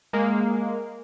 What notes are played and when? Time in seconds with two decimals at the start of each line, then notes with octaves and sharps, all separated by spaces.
0.13 G#3 A#3